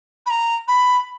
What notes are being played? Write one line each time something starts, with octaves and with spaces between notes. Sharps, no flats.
B5
A#5
B5